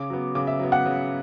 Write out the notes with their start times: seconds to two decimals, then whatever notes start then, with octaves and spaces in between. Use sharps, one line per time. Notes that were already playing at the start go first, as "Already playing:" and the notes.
Already playing: C#3 D6
0.10 F#3 B3
0.35 C#3 D6
0.47 E5
0.59 F#3 B3
0.72 F#5
0.86 C#3